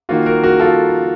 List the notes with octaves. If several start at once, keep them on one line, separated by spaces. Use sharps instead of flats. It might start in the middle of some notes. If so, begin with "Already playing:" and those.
D#3 A#3 F4 F#4
F#4 A#4
F#4 A#4
F4 A4